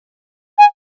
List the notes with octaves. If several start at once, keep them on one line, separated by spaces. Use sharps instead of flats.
G#5